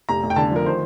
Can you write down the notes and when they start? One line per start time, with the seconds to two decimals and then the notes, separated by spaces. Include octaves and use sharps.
0.09 F1 A#5
0.23 F1
0.30 G5
0.36 D3 A5
0.51 F3 A#4
0.66 D#3 C5